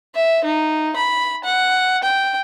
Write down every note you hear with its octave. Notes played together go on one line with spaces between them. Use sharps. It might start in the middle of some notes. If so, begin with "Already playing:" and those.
E5
D#4
B5
F#5
G5